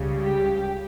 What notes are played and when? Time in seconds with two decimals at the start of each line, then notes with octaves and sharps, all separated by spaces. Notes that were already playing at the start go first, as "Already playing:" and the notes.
Already playing: C#2 C#3 G3
0.23 G4